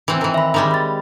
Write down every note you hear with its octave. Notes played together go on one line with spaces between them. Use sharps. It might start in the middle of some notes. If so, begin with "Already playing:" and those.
E3 C4
D#3 E3
E5 B5
D#3 G3 G#3
B5 A6